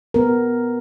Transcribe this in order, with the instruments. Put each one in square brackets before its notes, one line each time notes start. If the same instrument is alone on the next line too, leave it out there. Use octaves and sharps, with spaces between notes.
[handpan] B3 A#4